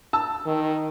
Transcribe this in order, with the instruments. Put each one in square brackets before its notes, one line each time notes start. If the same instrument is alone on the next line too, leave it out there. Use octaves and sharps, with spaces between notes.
[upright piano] A5 E6
[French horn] D#3